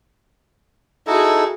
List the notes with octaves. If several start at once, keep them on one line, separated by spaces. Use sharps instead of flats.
D#4 E4 F#4 G#4 A4